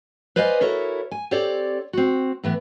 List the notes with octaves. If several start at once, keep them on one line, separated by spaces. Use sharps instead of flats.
B4 C5 D5 D#5 F5 G#5
E4 F#4 A4 A#4 C#5 E5
G#5
C4 G4 A4 C#5 D5
C4 F#4
A2 E3 B3